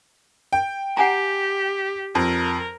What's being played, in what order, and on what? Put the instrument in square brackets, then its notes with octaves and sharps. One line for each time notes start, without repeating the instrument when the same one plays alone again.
[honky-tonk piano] G5
[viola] G4 [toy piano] F#5 G#5 A#5
[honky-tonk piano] F2 [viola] A#4